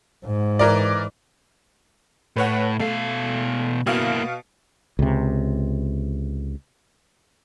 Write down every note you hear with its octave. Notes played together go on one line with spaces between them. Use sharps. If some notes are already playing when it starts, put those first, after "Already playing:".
G#2
E3 A#4 D5
A2 B4 C#5 F#5
B2 A3 F5
B2 A#3 E4 F5
C#2 C3